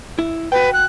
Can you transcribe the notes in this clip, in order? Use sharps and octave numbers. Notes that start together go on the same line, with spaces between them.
E4
F#4 B4 G5
F#6